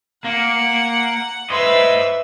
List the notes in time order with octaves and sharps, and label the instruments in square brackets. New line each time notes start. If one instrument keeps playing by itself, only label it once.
[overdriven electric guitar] A#3 [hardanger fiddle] F#5
[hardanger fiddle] B4 E5 [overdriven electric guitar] C5 D#5